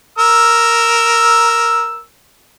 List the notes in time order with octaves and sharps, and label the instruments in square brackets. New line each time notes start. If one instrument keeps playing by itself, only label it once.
[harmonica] A#4 E6